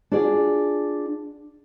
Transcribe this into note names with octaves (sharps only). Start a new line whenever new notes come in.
D4 F4 F#4 G#4 D5